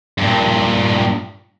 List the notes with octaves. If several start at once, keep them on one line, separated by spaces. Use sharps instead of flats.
G2 A#2